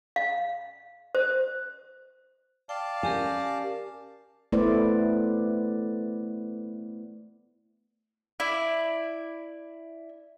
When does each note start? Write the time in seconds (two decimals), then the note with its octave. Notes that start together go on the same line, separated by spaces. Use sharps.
0.16 F5
1.15 C5
2.69 D5 F5 G5 A5
3.03 C#4 G4 A#4 G#5
4.52 A3 B3 E4 B4 C5 D5
8.40 E4 D5